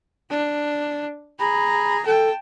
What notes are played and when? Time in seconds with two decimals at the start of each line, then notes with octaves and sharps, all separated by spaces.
0.30 D4
1.39 G#4 A#5 B5
2.06 A4 G5 A5